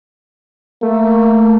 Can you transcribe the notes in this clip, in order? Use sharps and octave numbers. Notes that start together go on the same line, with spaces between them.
A3 A#3